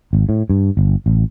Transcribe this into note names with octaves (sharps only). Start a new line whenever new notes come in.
G#1
A2
G2
G1
A1